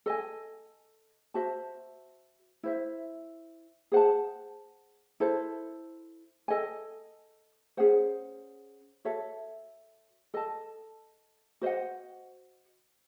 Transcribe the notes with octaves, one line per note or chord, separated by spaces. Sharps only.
A4 D#5 G#5
F#4 C5 E5 A5
E4 C5 E5
G#4 C5 F#5 A5
E4 A4 C5
A4 D#5 G#5
C#4 G#4 C5 F#5
F#4 A4 C#5 E5
A4 D#5 A5
F#4 C5 D#5 F#5